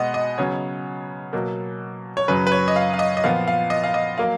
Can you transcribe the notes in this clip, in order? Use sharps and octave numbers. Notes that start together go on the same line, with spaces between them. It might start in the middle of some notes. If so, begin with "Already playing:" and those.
Already playing: B2 G#3 B3 D#5 F#5
D#5
C#3 F#3 B3 C#5
B2 F#3 A#3
C#5
F#2 C#3 F#3 B4
B4
C#5
D#5
F5
F5
D#5
D#5
A#2 F3 B3 F5
F5
D#5
F5
D#5
F#3 A#3 F5